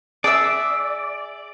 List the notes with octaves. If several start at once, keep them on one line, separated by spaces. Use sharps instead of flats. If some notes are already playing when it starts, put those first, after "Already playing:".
G#4 D5 E5 F#5 D#6 E6